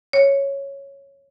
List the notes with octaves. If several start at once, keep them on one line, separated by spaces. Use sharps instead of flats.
C#5